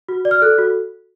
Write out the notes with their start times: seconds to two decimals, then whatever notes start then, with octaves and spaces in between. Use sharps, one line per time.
0.09 F#4
0.25 D5
0.31 F6
0.42 A4 F#6
0.58 F#4